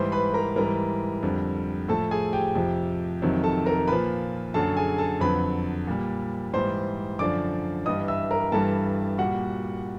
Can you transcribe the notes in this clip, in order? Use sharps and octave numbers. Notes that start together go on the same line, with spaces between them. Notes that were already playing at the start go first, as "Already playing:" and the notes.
Already playing: G#2 E3 G3 C5 C6
B4 B5
A#4 A#5
G#2 E3 G3 A#4 A#5
F2 D3 G3
A2 F3 A4 A5
G#4 G#5
G4 G5
F2 C3 F3
F2 C3 D#3 F#3
A4 A5
A#4 A#5
A#2 F3 B4 B5
F#2 D3 F#3 A4 A5
G#4 G#5
A4 A5
F2 D3 F#3 B4 B5
A#2 G3
G#2 E3 G3 C5 C6
F#2 D3 F3 D5 D6
G2 E3 G3 D#5 D#6
E5 E6
A#4 A#5
G2 E3 G3 A4 A5
A#2 G3 F#4 F#5